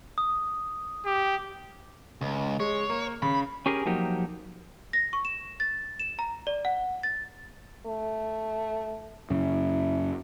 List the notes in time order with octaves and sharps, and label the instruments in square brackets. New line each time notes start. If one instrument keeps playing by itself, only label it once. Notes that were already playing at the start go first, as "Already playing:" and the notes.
[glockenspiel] D#6
[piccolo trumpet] G4
[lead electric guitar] C#2
[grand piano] G#3 [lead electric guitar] C#5
[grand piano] A#3
[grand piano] C#3 [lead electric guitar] B5
[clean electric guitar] C#4 G4 G#4 A#4
F3 F#3 A#3 D#4 G4
[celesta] A#6
C#6
E7
A6
E7
A#5
D5
F#5
A6
[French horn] A3
[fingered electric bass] F#2 C#3 [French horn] E4